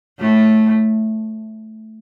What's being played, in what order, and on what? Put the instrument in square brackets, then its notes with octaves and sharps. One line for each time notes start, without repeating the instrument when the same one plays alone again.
[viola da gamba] A2 A3